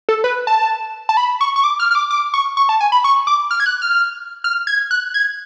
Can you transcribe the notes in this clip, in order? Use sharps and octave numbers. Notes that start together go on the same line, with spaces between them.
A4
B4
A5
A5
B5
C#6
C#6
D6
F6
F6
D6
D6
C#6
C#6
A5
G#5
B5
C#6
D6
F6
G#6
F#6
F6
F6
G#6
F#6
G#6